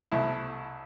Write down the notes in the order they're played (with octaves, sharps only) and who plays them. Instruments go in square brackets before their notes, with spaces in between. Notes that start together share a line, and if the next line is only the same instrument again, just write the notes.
[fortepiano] C2 B2 A3 E4